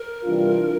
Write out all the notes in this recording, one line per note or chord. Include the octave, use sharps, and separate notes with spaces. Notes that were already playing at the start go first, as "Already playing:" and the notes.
Already playing: A#4
C3 E3 G3 D4 F4